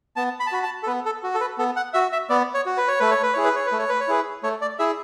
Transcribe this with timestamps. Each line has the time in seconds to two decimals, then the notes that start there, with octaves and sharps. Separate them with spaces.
0.16 B3 A5
0.40 B5
0.47 A5
0.52 F#4 B5
0.63 A5
0.83 A4
0.87 B3 B4
1.05 A4
1.23 F#4
1.35 A4
1.41 B4
1.58 B3 A4
1.76 F#5
1.94 F#4 E5
2.12 E5
2.30 B3 D5
2.54 C#5
2.66 F#4
2.77 B4
2.88 C#5
3.00 A3 B4
3.11 C#5
3.23 B4
3.34 E4 G#4 C#5
3.44 B4
3.56 C#5
3.67 B4
3.72 A3
3.79 C#5
3.89 B4
4.00 C#5
4.08 E4 G#4 B4
4.43 A3 C#5
4.61 D5
4.79 E4 G#4 E5